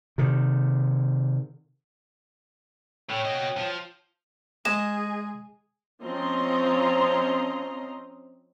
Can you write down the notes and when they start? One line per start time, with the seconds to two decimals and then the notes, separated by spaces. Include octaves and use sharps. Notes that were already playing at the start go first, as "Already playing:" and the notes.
0.18 C3 D#3
3.10 A2 C#5 G5
3.25 F#4 D#5
3.57 F3
4.65 G#3 G#4 D#5 E7
6.02 F3 C4 C#4 D#5 A#5 C6